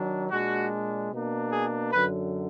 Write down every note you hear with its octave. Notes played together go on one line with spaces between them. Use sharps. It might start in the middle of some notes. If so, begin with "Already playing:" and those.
Already playing: D#3 F#3 D4
A#2 G#3 D4 F#4
B2 A#3 D4
G#4
F#2 D3 F#3 B4